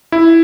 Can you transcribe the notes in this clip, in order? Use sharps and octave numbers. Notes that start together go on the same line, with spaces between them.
E4